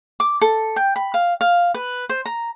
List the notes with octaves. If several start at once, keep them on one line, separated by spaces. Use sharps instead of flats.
D6
A4
G5
B5
F5
F5
B4
C5
A#5